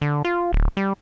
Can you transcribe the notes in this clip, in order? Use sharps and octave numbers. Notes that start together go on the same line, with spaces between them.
D3
F4
D1
G3